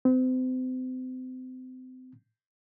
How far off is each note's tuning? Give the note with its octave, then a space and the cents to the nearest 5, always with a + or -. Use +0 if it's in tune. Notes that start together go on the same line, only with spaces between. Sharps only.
C4 -35